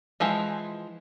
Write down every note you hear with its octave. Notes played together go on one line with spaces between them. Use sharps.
E3 F3 G#3